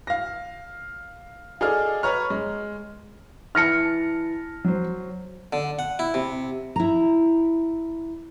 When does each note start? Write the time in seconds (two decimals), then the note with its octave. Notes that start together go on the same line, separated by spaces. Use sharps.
0.07 F5 A#6
1.61 G#4 A4 D5 D#5 F5 F6
2.03 B4 C#5 A#5 C#6 F6
2.30 G#3
3.55 E3 A5 F6 A#6 C#7
4.64 F#3 C5
5.53 D3
5.79 F#5
5.99 E4
6.14 C3
6.76 E4 A#5